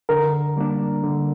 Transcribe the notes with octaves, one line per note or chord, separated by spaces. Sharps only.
D3 A#4
G3 A#3 D4
D3